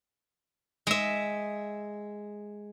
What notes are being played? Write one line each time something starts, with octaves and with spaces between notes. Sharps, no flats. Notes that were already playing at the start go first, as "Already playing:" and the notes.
G#3 E5